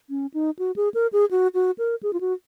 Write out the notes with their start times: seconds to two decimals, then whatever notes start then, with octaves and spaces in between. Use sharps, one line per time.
0.10 C#4
0.34 D#4
0.59 F#4
0.76 G#4
0.94 A#4
1.13 G#4
1.31 F#4
1.54 F#4
1.78 A#4
2.03 G#4
2.13 F4
2.21 F#4